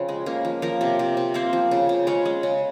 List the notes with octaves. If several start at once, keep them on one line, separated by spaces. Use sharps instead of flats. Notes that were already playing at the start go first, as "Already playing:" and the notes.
Already playing: C#3 F3 C4 F4
G#3
A#3 C#4
F3
F3 A#3 A#4
C3
C3
C3
A#3 C4 C5
F3
C#3
C#3
G#3 C#4 C#5
G#3
C#3